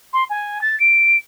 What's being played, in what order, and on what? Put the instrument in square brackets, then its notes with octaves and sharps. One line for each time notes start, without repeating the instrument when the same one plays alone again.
[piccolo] C6
G#5
A6
D7